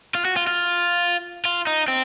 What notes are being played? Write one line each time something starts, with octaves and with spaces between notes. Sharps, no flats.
F4
F#4
F4
F4
F4
D#4
C4